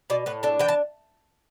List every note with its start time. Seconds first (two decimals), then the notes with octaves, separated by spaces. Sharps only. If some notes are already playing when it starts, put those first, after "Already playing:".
0.10 B2 D5
0.26 A2 B4
0.43 D4 A4
0.59 E3 G5
0.68 A5